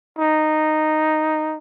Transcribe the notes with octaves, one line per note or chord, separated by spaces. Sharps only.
D#4